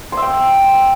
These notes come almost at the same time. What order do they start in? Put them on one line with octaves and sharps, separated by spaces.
C6 E5 G5